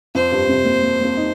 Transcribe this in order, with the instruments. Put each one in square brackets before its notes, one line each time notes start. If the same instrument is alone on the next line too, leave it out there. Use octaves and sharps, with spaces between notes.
[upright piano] F2 [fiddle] C5
[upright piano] G2
C3
A#3
A#3
A#3
C4
D#4